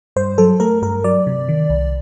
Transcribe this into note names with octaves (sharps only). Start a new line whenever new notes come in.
G2 C5
F#3 A4
A3 A#4
G2 A#4
F#3 D5
C3
D#3
C2